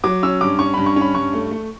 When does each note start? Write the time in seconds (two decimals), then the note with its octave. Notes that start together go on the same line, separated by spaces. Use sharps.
0.04 F#3 D6
0.23 C#4 E6
0.41 G2 D6
0.59 C#4 C#6
0.74 G2 B5
0.86 C#6
0.96 C#4 B5
1.15 G2 C#6
1.33 A3
1.51 A3